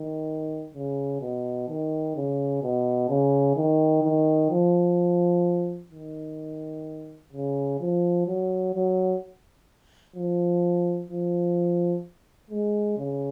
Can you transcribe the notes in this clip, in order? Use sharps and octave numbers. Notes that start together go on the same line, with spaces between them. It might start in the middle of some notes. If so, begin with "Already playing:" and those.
Already playing: D#3
C#3
B2
D#3
C#3
B2
C#3
D#3
D#3
F3
D#3
C#3
F3
F#3
F#3
F3
F3
G#3
C#3